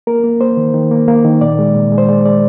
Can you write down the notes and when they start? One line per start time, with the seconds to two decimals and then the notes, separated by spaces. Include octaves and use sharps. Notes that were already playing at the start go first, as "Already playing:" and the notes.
0.07 A#3 A#4
0.24 A#3
0.41 A#3 C5
0.57 D#3
0.74 D#3
0.91 A#3
1.08 A#3
1.25 D#3
1.41 A#2 D5
1.59 G#3
1.75 A#2
1.92 G#3
1.98 C5
2.09 G#3 D5
2.26 G#3 D5